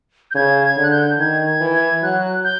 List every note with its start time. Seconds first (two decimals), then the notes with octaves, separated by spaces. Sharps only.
0.31 G6
0.35 C#3 G#6
0.63 G#6
0.77 D3
0.83 F#6
0.91 G6
1.19 D#3 G#6
1.47 G#6
1.61 E3
1.75 G#6
2.03 F#3 F#6
2.44 G6